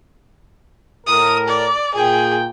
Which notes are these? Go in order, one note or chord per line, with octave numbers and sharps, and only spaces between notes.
A2 A#4 D#6
D5
A#2 G#4 G5